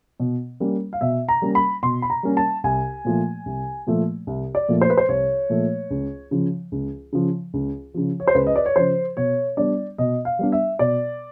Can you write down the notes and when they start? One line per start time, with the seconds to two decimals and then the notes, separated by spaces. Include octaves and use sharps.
0.20 B2
0.60 G3 A#3 C#4
0.93 F5
1.01 B2 E5
1.28 A#5
1.42 G3 A#3 C#4
1.55 B5
1.83 B2 C6
2.02 B5
2.10 A#5
2.23 G3 A#3 C#4
2.37 A5
2.64 C2 G#5
3.05 A#2 F3 A3
3.46 C2
3.87 A#2 F3 A3
4.27 C2
4.55 D5
4.69 A#2 F3 A3
4.81 C5
4.90 B4
4.97 C5
5.09 C2 C#5
5.50 A#2 F3 A3
5.90 C#2
6.31 C#3 F3
6.72 C#2
7.13 C#3 F3
7.54 C#2
7.94 C#3 F3
8.20 C#5
8.28 C5
8.35 C#2 B4
8.47 D#5
8.56 D5
8.66 C#5
8.76 C#3 F3 C5
9.17 B2 C#5
9.57 G3 B3 D4 D5
9.98 B2 D#5
10.25 F5
10.39 G3 B3 D4
10.52 E5
10.79 B2 D5